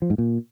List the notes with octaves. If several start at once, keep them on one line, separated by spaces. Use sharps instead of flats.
F3
G#2
A#2